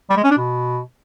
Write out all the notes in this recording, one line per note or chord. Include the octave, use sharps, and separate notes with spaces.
G3
G#3
C#4
D4
B2